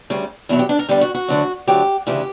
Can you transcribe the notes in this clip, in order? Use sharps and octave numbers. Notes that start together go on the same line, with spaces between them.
D2 C#3 G3
E2 B2 F#3 E4
G4
D4
A#4
E2 D3 G3 G4
F#4
F#4
D2 D3 F#3
D2 D3 F#3 G4
D2 C#3 E3 G4